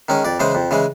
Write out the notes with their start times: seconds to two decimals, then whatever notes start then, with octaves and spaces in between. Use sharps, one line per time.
0.09 D#3 G#3 C#4
0.25 F2 D5
0.40 C#3 E3 G#3 C5
0.55 F2
0.71 C#3 E3 G#3